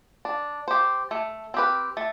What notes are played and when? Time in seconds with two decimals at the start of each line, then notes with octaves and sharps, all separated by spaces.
0.25 D4
0.68 G4 C5
1.11 A3
1.54 C4 G4 B4
1.97 A3